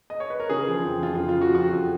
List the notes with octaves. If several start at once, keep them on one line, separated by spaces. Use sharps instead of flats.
D#5
C#5
B4
A#4
C#3 G#4
F3
F2
F2 F4
C#3 F4
F4
F3 F#4
F2 F#4
F2